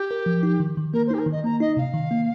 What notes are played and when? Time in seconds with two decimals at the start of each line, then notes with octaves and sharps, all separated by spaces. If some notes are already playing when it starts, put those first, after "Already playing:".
Already playing: G4
0.11 A#4
0.26 F3
0.43 D#4
0.60 D#3
0.77 D#3
0.93 A#3 A#4
1.06 C5
1.10 D#4 G4
1.19 A#4
1.26 D#3 D#5
1.44 A#3 A#5
1.60 D#4 D#5
1.77 C3 F5
1.94 D#3
2.11 A#3